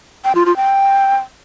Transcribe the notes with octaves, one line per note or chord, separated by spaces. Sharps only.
G5
F4
F4
G5